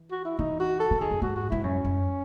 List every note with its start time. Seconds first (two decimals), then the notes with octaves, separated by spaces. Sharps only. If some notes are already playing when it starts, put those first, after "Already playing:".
Already playing: E3
0.11 F#4
0.25 E4
0.39 E3 D#4
0.60 F#4
0.80 A4
0.91 E3
1.00 D#3 G#4
1.11 F#2
1.22 G#2 F#4
1.36 F#4
1.50 G#2 E4
1.64 F#2 C#4
1.85 F#2